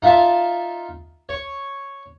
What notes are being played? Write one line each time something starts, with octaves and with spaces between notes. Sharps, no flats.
D#4 F4 E5 F5 A5
C#5